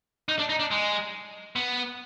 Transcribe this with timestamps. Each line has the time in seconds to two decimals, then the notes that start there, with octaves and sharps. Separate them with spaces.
0.29 D#4
0.39 D4
0.49 D#4
0.60 D4
0.71 G#3
1.56 B3